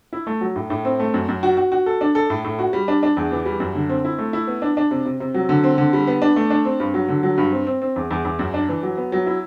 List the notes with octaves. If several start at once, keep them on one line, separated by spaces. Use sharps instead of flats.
E4
A3
F#3
A2
A2
C4
A3
F#2
F#2
F#4
F#4
F#4
A4
D4
A4
A2
A2
F#4
G3
D4
D4
E2
E3
G3
F#2
D3
C4
E4
A3
E4
B3
D4
D4
C3
C3
C3
F#3
D3
C4
D3
G3
B3
D4
A3
D4
C4
G2
F#3
D3
F#3
G2
C4
C4
C4
E2
E2
E2
F#2
D4
E3
F#3
B3
F#3
E4